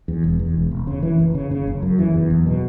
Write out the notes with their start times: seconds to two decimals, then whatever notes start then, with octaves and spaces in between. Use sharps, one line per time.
0.08 E2
0.24 E1
0.39 E2
0.55 E1
0.71 E1
0.87 C#3
1.03 E3
1.19 F#1
1.35 C#3
1.51 C#3
1.67 F#1
1.83 F#2
1.99 E3
2.14 E2
2.30 F#1
2.47 B2